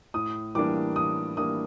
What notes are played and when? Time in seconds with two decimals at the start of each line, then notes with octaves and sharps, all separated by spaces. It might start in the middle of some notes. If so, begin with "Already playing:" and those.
0.14 A2 D#6
0.55 E3 G3 A#3 D4 D6
0.96 A2 D#6
1.37 E3 G3 A#3 D4 D#6